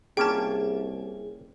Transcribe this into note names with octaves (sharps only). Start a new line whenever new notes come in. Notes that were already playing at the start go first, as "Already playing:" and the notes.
C2 A#3 C#4 F4 G#4 G5 A5